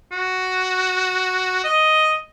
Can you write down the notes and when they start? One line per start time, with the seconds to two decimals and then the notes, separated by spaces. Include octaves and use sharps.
0.12 F#4
1.64 D#5